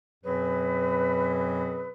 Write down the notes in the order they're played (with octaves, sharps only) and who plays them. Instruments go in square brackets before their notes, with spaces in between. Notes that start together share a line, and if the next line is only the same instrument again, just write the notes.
[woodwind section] F#2 B2 F#3 C4 G#4 B4